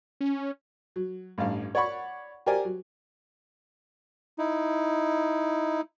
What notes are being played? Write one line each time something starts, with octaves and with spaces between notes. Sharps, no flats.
C#4
F#3
A1 G2 F5
C#5 D5 F#5 B5 C#6
G4 A#4 C5 D5 G#5
F#3
D#4 E4